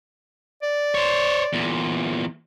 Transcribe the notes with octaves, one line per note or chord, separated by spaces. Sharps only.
D5
C5 C#5
E2 A#2